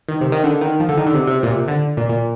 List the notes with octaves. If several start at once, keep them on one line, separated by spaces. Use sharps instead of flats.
D#3
C3
D#3
D3
D#3
F3
D3
D#3
D3
C3
C3
A#2
C3
D3
A#2
A#2